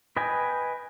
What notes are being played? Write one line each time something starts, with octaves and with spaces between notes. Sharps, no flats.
B4 D#5 G5 G#5